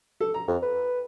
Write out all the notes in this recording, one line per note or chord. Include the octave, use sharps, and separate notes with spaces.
A4
A#5
F2
B4